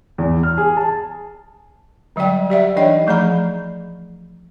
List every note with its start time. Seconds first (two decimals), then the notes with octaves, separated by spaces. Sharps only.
0.18 E2
0.43 F6
0.58 G#4
0.77 A5
2.16 D3 F#3 G3 D5 G5
2.50 G4 D5 E5 F#5
2.76 E3 D4 D#4 C#5 D#5 G5
3.07 F3 A3 G#4 A#5 B5